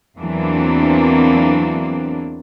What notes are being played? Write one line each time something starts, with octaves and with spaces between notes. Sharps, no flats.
E2 E3 F#3 A#3 C4 D4